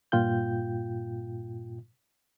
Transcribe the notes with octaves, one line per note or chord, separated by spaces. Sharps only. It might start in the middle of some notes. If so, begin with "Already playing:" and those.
G2 A#2 F4 G5 G6